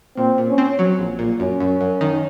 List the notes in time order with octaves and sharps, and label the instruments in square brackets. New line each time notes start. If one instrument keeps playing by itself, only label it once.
[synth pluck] A#2 [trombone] C4
[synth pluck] A#2
[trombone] C#4
[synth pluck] C4
F#3
A#1
A#2
[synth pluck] F#2 [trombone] C#4
[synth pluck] F#2
F#2
D#3